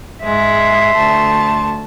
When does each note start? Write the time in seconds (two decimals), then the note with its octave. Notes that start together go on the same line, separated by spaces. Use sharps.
0.23 G#2 G#3 E5 C6
0.94 D2 A3 A5